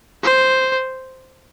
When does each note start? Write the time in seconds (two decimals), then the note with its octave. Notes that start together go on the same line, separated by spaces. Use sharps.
0.23 C5